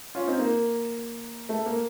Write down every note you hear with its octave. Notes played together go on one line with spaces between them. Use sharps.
C#4 F4
C4 D#4
A#3
A3
A#3